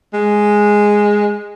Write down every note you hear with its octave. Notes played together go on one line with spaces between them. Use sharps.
G#3